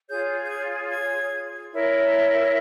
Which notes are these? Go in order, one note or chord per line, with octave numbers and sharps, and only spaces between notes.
F4 G#4 C#5 G6
G6
G#6
G#6
E4 A#4 C#5